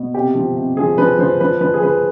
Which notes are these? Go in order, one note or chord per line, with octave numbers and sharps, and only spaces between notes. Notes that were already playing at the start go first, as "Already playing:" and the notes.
Already playing: B2
C3 G4
F3
C3
F3 G#4
F3 B4
F3 C5
F3 B4
F3 B4
G#4
F3 B4